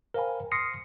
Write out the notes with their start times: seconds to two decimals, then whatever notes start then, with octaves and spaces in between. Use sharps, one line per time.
0.14 A#4 C5 F5 G5 G#5 B5
0.52 C6 D#6 F6 A#6 C7 C#7